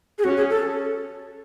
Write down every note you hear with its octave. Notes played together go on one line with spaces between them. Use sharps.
G#4
C#4 F#4
G#4
A4